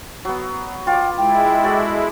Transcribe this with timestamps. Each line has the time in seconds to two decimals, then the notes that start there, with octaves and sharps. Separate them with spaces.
0.25 F#3 B3
0.87 F4 G5 D6
1.18 G#3 E4 G5
1.63 F#4 A4 D5